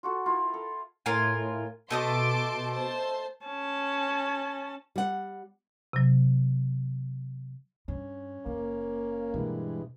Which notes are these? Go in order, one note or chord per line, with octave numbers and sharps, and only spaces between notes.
F4 F#4 A4
E4 F4 A#4
A4
A2 F4 A#4 G#5
B2 A3 D#5 A5 C6 D6 D#6
C5 A5
C#4 A5
G3 F#5
C3 F#3
G2 C#4
F#1 A#3
G2 B2 E3 G#3